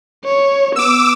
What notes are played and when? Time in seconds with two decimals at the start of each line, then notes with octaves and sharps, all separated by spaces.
0.25 C#5
0.76 B3 D6 E6